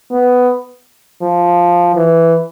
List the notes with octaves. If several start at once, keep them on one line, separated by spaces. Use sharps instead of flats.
B3
F3
E3